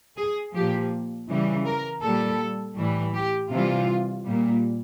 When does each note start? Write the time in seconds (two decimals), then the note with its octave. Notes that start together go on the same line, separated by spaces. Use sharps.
0.17 G#4
0.55 A#2 F3 G4
1.29 C#3 E3 G3
1.66 A#4
2.03 A#2 G3 A4
2.78 A2 E3 G3
3.15 G4
3.51 C3 E3 G3 F4
4.25 A#2 G3